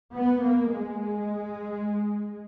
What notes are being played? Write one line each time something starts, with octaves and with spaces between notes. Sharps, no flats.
B3
A#3
G#3